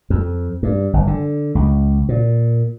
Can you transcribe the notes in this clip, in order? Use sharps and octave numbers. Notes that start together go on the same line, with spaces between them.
F2
G2
G1
D3
C#2
A#2